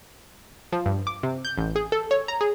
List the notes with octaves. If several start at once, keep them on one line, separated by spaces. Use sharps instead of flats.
F3
G2
D6
C3
G6
A1
G#4
A4
C#5
A#5
G#4